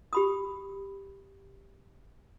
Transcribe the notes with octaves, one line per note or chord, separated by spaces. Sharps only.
G4 B5 D#6